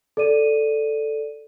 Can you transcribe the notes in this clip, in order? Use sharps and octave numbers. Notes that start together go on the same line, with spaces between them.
A4 D5 D#7